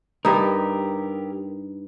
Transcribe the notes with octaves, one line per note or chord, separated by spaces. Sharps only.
G2 D#4 G4 A#4